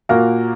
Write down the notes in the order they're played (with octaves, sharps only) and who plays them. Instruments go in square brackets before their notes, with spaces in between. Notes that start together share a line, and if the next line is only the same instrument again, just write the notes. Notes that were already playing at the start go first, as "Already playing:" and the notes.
[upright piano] A#2 A#3 F#4 A#4